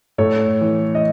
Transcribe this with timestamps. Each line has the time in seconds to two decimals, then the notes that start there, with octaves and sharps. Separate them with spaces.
0.18 A2 A4 C#5
0.61 E3
0.95 D#5